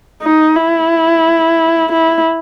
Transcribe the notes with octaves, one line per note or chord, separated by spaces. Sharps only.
D#4
E4
E4